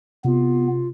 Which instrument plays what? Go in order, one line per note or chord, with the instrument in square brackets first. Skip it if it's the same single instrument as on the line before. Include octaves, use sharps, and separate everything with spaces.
[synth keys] C3 [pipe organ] B3 [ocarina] F4